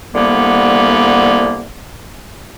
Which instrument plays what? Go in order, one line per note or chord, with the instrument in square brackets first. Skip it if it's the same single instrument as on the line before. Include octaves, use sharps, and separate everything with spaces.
[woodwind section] C2 D3 G3 A#3 B3